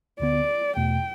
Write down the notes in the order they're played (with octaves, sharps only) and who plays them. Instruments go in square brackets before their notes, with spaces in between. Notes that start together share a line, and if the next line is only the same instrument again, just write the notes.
[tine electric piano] D2 D3 B3 [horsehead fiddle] D5
[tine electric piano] E2 B2 A3 [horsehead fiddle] G5